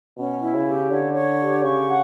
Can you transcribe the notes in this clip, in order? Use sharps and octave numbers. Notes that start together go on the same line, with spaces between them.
B2 C#4
E4
C#3
G4
D3 C#5
C#5
G4
C#3 C#6
F#5